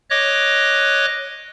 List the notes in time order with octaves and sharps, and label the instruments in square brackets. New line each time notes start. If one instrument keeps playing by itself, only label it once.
[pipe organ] C#5 D#5 D6 F#6